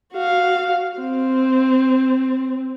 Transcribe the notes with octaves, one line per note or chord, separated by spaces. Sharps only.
F#4 F5
C4